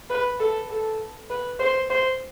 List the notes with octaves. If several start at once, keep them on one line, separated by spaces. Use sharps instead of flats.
B4
A4
A4
B4
C5
C5